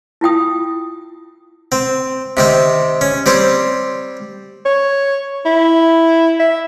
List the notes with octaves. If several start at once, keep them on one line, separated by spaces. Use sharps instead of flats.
E4 F4 G5 D#6
C4
C3 D#3 C4
C#4
G3 C4 C5 C#5
C#5
E4
E5